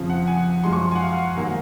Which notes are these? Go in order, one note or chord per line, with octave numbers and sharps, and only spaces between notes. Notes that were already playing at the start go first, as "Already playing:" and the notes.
Already playing: F2 C#3 F3
F#5
G#5
F#2 F3 G#3 C6
C#6
C6
G#5
F#5
F5
G#2 D#3 F#3 A#3